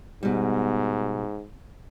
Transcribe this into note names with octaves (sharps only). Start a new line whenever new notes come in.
G#2 B2 G3